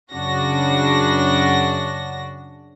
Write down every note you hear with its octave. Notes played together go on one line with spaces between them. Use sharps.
F#2 C#3 D4 F#4 A#6